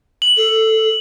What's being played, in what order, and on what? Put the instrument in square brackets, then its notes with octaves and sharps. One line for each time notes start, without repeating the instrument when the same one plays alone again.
[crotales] F#7
[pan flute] A4